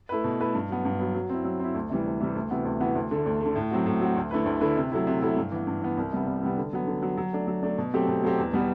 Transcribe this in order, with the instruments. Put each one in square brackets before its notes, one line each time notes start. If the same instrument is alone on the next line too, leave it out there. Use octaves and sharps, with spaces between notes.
[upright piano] A3 E4 B4
B2
A3 E4 B4
G2
F#3 B3
G2
F#3 B3
F#3
C4 E4
F#3
C4 E4
D2
C3 E3 G3
D2
C3 E3 G3
D2
C3 E3 B3 F#4
D2
C3 E3 B3 F#4
D2
D3 A3
D2
A3
D3
A2
F#3 C4 F#4
A2
F#3 C4 F#4
D2
D3 A3 E4 B4
D2
D3 A3 E4 B4
C3
F#3 A3 E4
C3
F#3 A3 E4
G2
E3 B3
G2
E3 B3
C2
C3 G3 B3
C2
C3 G3 B3
D3
F#3 B3
D3
F#3 B3
F#3
A3 D4
F#3
A3 D4
B2
F#3 A3 C4 G4
B2
F#3 A3 C4 G4
E2
B2 G3 B3